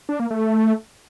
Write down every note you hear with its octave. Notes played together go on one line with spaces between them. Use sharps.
D4
A#3
A3